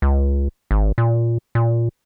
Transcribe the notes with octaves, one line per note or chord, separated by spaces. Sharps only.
C#2
G#1
A#2
A#2